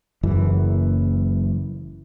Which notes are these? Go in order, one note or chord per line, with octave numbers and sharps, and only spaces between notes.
F#1 F#2 E3